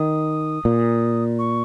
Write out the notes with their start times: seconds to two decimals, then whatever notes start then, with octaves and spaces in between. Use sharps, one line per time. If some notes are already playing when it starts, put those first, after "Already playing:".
Already playing: D#3 D#6
0.65 A#2
1.39 C#6